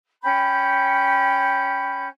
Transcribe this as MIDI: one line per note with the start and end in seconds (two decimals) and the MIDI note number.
0.22 2.06 61
0.22 2.06 79
0.22 2.06 83
0.22 2.06 91